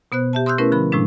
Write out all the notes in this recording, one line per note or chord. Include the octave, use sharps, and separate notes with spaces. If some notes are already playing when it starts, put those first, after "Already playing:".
B2 B3 C5 F#6
G4 E5 A5
C6 D#6 E6 F#6 G6
A3 C#4 E4 A#4 B4
D3 F3 B5
A2 C3 F3 G#3 D4